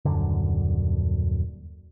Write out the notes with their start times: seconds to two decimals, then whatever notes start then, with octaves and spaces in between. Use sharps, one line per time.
0.05 D#1 F#2 D3